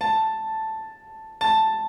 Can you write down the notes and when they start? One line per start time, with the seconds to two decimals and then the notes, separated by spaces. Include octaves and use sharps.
0.01 A5
1.41 A5